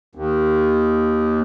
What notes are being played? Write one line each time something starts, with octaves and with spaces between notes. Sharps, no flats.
D#2